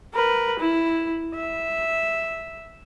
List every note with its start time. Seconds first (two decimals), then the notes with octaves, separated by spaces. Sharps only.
0.14 A#4 B4
0.60 E4
1.35 E5